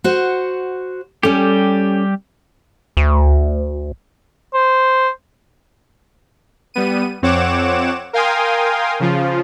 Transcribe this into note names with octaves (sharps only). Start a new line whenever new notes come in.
F#4 C5 F#5
G3 C#4 G4 A4
D2
C5
G3 B3 D#7
F2 C4 C#5 F#5 D6 E7
A#4 F5 G5 G#5 C6 D#6
C#3 F3 F4